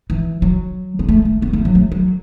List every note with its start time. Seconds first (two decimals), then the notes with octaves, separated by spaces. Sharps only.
0.10 E3
0.42 F#3
0.99 B3
1.09 A3
1.25 A3
1.42 B3
1.53 A3
1.65 F#3
1.75 A3
1.92 F#3